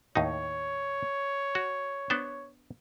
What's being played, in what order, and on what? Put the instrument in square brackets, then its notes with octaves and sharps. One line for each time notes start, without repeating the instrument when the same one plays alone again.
[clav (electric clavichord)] D#2 A2 D#4 [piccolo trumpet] C#5
[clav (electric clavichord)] F#4
B3 D4 C5